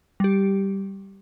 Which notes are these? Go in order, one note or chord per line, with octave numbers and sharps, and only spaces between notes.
G3 G4